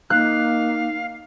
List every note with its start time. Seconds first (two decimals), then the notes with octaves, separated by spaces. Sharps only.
0.10 A#3 D#4 F5 F#6